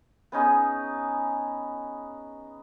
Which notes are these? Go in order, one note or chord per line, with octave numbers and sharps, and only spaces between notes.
B3 C#4 D#4 G#4